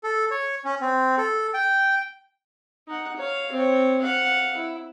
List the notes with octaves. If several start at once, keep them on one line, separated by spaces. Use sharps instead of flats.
A4
C#5
C#4
C4
A4
G5
D#4 F#5
C#5 F5
C4 C#5
F5 F#5
E4